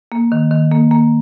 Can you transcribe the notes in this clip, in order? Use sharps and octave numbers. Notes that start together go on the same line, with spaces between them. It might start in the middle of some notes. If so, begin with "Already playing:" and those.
A#3
D#3
D#3
A#3
A#3